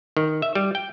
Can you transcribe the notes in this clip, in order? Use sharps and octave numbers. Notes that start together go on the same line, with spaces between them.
D#3
E5
G3
G5